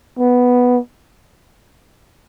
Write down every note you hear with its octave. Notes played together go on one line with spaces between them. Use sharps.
B3